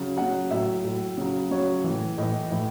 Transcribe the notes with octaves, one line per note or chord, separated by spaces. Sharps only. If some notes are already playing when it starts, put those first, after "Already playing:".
Already playing: C#3 F#3
C#3 F#3 F#5
A2 F#3 E5
A2 F#3
C#3 F#3
C#3 F#3 C#5
A2 E3
A2 E3 D#5
A2 E3